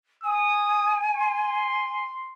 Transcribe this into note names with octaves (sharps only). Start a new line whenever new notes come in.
G#5 D#6
C6